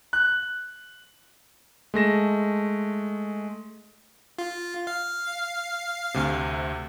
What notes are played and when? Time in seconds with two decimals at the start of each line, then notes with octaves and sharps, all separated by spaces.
0.13 F#6
1.94 G#3 A3 A#6 E7
4.39 F4
4.87 F5
6.14 D2 C3